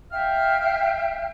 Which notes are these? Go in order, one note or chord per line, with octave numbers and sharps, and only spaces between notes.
E5 F5 G5 F6